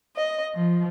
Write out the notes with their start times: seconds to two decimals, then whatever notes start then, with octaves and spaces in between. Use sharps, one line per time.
0.17 D#5
0.55 F3